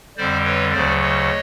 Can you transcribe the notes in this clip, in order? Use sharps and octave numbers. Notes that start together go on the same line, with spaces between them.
F2 D3 G3 C5 D5
B4 C#5
D2 C#3 F#3 C5 D5
C#5 D#5